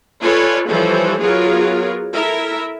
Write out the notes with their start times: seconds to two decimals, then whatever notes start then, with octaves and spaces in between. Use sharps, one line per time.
0.22 F4 A4 B4 C#5 D5 G#5
0.70 E3 F3 G3 A4 C5 C#5
1.21 F#3 B3 F4 G#4 A#4 C#5
2.14 E4 A4 A#4 E5